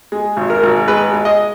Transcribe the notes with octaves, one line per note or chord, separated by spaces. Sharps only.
G#3
G#1
A#4
G#1
G#3 B4
G#3
D#5